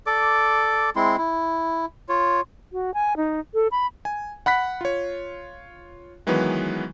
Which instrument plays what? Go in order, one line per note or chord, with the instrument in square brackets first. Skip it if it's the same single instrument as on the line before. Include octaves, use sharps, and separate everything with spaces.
[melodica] A4 D5 D6
G#3 C4 E4 C6
E4
F4 C#5
[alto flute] F#4
G#5
D#4
A4
B5
[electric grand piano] G#5
F#5 B5 F#6 B6
F4 C#5
D#3 E3 F#3 G#3 B3 B4